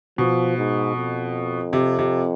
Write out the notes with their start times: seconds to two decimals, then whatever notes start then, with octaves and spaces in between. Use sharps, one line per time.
0.18 B2 F3
0.57 G#2
0.96 F2
1.73 C3
1.99 C3